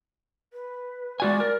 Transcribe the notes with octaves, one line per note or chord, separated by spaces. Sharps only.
B4
G#3 F#4 D5 G#5
A#4